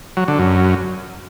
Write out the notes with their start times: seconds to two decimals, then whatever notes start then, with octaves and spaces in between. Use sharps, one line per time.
0.17 F#3
0.28 D3
0.39 F#2